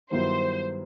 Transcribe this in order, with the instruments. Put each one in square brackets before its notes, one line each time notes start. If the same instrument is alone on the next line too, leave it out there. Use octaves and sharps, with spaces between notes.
[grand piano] G2 D#3 F#3 B3 E4 [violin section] C5